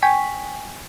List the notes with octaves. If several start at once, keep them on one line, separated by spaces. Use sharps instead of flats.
G5 G#5 C#6 B6